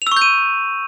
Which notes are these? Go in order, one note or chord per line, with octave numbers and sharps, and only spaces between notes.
C#6 E6 G6 D#7 F7